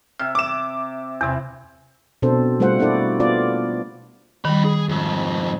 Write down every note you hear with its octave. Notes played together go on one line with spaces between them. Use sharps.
C3 E5 F6
D6 E7
E2 C3 E3 C4
B2 C4 D4 A4 C5
G3 A3 F4 C5 F#5
A#3 D4 E4 F#4 A4 D5
B3 F4 D5
F2 D#3 G3 B5
G#4
F2 G#2